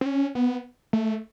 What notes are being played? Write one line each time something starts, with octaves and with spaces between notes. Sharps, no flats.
C4
C#4
B3
A3